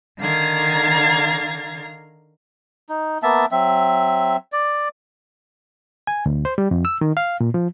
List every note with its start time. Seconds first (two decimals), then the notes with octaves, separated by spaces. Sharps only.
0.19 D3 D#3 F5 A#5 G#6 A6
2.89 D#4
3.23 A#3 B3 E5 A5
3.52 F#3 C4 E5
4.52 D5
6.07 G#5
6.26 D2
6.45 C5
6.58 G3
6.71 F2
6.85 E6
7.01 D#3
7.17 F5
7.40 A#2
7.54 F3